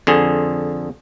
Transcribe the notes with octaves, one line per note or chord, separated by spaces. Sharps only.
F2 D3 G#4